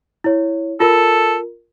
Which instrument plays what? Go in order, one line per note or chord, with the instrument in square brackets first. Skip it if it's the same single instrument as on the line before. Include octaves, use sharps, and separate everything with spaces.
[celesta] E4 C#5
[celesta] F4 A#4 [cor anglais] A4